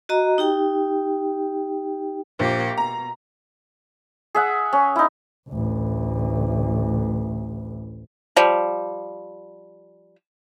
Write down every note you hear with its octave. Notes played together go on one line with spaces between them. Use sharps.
F#4 D#5 A#5
D#4 G4 G5
A#1 A#3 G4
B2 A#5
G#4 E5 F#5
C#4
D#4 E4
A1 D2
F3 G3